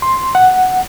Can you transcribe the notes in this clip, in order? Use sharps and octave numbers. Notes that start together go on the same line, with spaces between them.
C6
F#5